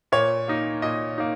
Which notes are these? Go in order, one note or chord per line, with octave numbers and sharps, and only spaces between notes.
A#2 C#5
A#3 D#4
A#2 D#5
A#3 D#4